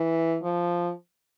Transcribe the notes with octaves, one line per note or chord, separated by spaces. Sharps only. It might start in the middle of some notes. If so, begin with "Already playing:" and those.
Already playing: E3
F3